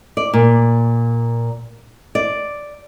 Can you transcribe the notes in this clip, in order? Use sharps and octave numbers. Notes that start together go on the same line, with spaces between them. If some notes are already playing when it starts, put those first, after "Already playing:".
D5
A#2
D5